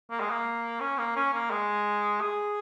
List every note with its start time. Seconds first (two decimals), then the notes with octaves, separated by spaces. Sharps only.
0.11 A#3
0.21 G#3
0.30 A#3
0.81 C#4
0.98 A#3
1.16 C#4
1.33 A#3
1.51 G#3
2.21 G#4